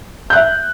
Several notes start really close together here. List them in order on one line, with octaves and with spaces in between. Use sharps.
G6 F#6 E5